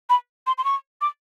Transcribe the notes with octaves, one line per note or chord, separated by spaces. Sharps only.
B5
C6
C6
C#6
D6